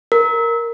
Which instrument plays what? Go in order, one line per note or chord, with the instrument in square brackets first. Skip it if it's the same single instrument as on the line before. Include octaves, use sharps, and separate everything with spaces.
[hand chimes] A#4